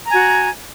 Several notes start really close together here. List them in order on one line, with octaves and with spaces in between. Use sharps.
A#5 G#5 F#4